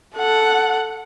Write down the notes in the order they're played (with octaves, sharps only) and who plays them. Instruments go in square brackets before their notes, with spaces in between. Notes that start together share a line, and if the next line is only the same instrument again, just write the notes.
[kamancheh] A4 F#5